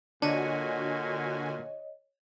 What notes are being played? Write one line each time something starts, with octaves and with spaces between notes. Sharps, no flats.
A#2 D3 D4 F#4 C#5 D#5 G#5